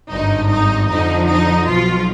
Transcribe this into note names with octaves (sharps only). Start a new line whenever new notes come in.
G#1 G2 D3 D#4
D#4
F2 D3 F3 D#4
D#4
B1 B2 F3 F4